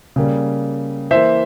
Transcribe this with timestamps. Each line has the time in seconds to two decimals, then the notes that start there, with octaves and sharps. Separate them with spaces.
0.16 C#3 G3 A#3
1.11 E3 A#3 C5 E5